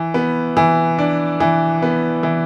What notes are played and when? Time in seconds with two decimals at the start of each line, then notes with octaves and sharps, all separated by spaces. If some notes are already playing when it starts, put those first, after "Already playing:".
Already playing: E3
0.14 B3
0.57 E3
0.99 D4
1.40 E3
1.82 B3
2.23 E3